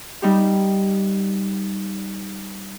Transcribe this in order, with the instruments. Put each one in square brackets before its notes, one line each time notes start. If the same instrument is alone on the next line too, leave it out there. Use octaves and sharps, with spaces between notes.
[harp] G3 D#4 G4